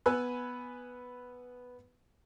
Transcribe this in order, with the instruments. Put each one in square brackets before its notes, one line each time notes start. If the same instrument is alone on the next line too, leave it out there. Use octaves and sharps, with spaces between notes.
[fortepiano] B3 B4 G#5 E6 F#6